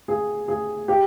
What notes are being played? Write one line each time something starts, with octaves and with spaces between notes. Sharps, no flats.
G#4
G#4
G4